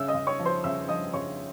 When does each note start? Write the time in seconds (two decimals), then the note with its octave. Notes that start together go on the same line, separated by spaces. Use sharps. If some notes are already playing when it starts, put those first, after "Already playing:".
Already playing: C#3 E5 E6
0.08 D#5 D#6
0.14 C#3
0.27 C#5 C#6
0.39 F3
0.46 C5 C6
0.64 C#3 E5 E6
0.89 F3 D#5 D#6
1.14 C#3 C#5 C#6